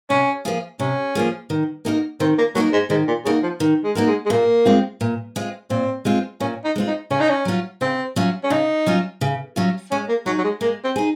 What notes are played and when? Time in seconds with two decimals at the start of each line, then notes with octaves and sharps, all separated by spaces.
0.10 C3 C#4
0.45 F3 A#3 F4 G#4
0.80 C3 C#4
1.15 F3 A#3 F4 G#4
1.50 D#3
1.85 A#3 D#4 F#4 A#4
2.20 D#3 C4
2.38 A#3
2.55 F#3 A#3 D#4 F#4 A#4
2.72 G#2
2.90 G#2 D#3
3.07 A#2
3.25 C#3 A#3 D#4 F#4 A#4
3.43 F3
3.60 D#3
3.84 G#3
3.95 A#3 D#4 F#4 A#4
4.07 G#3
4.26 G#3
4.30 A#2 A#3
4.65 G#3 C4 F4
5.01 A#2
5.36 G#3 C4 F4
5.70 A#2 C4
6.05 G#3 C4 F4
6.40 A#2 C#4
6.64 D#4
6.76 G#3 C4 F4
6.87 D#4
7.10 C#3 C#4
7.20 D#4
7.29 C#4
7.45 F#3 C#4 F4
7.81 C#3 C4
8.16 F#3 C#4 F4
8.44 C#4
8.50 C#3 D#4
8.87 F#3 C#4 F4
9.21 C#3
9.56 F#3 C#4 F4
9.91 G#3 C#4
10.09 A#3
10.26 F#3 D#4 G#4
10.38 F#3
10.44 G#3
10.61 G#3 A#3
10.84 C4
10.96 D#4 G#4